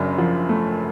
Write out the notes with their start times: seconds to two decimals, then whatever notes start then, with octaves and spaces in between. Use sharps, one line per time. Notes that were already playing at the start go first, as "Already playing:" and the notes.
Already playing: F#1 F#2 D4
0.18 F3
0.49 A3